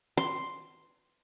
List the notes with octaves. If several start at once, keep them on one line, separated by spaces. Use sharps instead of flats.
C6